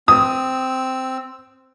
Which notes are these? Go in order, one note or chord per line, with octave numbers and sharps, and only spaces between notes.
C4 D#6 E6